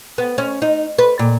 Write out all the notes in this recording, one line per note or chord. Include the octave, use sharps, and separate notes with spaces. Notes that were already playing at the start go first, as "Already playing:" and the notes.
B3
C#4
D#4
B4
A#2